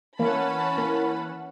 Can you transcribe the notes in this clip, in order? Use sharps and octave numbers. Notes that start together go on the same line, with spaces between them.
E3 A#3 C#4 F#5 A5 B5
A#3